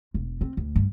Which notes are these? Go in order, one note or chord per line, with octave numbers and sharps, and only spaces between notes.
E1
C4
D2
G2